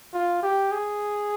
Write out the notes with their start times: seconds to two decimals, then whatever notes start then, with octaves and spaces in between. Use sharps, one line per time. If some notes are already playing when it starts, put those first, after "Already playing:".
0.14 F4
0.43 G4
0.72 G#4